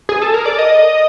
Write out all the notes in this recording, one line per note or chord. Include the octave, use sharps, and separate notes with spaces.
G#4
A4
A#4
D5
D#5